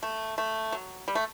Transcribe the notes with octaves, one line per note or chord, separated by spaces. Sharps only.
A3
A3
F#3
G3
A3